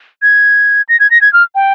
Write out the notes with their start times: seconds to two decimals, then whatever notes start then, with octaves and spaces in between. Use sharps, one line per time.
0.22 G#6
0.89 A#6
1.00 G#6
1.10 A#6
1.21 G#6
1.33 F6
1.55 G5